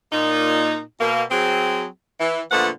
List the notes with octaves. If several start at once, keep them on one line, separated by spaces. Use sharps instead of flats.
A#2 D#4
B2 A#3
F#3 C4 G#4
E3
A#2 D3 F3 A3 B3 F#5